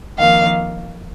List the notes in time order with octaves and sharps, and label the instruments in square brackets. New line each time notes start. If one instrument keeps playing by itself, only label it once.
[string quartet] F2 D#3 A#3 F5